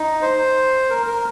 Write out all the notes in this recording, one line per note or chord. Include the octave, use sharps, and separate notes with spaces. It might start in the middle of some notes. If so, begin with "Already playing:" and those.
Already playing: D#4
C5
A#4
A#4